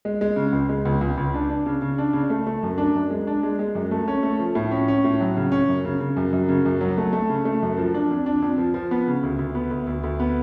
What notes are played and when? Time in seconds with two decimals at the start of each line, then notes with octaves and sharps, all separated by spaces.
0.05 G#3
0.21 G#3
0.36 C#3
0.52 C#2
0.69 G#3
0.85 C#2
1.01 C#2
1.17 C#2
1.34 D4
1.49 D4
1.66 C#3
1.82 C#3
1.98 D4
2.13 C#3
2.30 A3
2.47 A3
2.63 F#2
2.78 D4
2.95 F#2
3.11 G#3
3.27 D4
3.43 G#3
3.59 G#3
3.75 F#2
3.91 A3
4.08 C#4
4.23 A3
4.39 F3
4.55 A2
4.71 C#4
4.88 C#4
5.04 A2
5.20 F#3
5.36 C#3
5.52 C#4
5.68 F#2
5.85 C#3
6.00 C#3
6.16 F#2
6.33 F#2
6.49 C#3
6.65 F#2
6.81 F#3
6.98 A3
7.13 A3
7.29 C#3
7.45 A3
7.62 F#2
7.77 F3
7.94 D4
8.11 F2
8.26 D4
8.42 F2
8.58 F3
8.74 F3
8.91 B3
9.07 C#3
9.23 D2
9.39 D2
9.55 B3
9.71 D2
9.87 D2
10.03 D2
10.20 B3